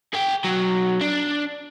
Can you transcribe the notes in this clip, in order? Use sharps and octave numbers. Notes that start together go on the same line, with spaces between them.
G#4 G5
B2 F#3
D4